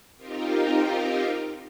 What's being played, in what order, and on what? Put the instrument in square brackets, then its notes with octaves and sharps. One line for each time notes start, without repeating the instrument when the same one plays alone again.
[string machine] C4 D#4 F4 G4 A#4